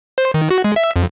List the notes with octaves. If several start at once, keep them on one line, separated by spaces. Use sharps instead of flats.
C5
D#3
F#4
G#3
E5
F2